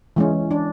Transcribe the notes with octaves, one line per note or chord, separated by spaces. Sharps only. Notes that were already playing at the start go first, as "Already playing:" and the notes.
E3 G#3 C#4
D4